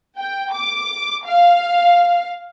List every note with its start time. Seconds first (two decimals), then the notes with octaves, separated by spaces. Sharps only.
0.18 G5
0.53 D6
1.25 F5